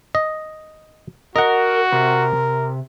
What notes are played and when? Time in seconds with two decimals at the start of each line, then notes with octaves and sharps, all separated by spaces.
0.15 D#5
1.36 F#4 A#4 D#5 F#5
1.92 C3 A#4